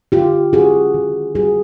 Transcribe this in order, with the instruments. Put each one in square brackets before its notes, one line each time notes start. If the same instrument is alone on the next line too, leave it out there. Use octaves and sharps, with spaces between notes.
[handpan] D3 F4 G4
C#4 F#4 G#4
D#3
G3 F#4 G#4